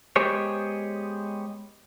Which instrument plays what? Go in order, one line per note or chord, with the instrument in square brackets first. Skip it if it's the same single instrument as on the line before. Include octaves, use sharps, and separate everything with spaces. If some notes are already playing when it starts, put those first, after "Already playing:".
[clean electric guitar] G#3 B3 G4 G#4 C5 C#5